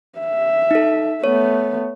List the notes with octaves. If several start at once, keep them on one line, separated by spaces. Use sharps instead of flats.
E5
D#4 A4
A3 B3 C#5